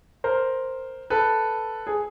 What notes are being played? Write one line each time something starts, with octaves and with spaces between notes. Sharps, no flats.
A#4 C5
A4 B4
G#4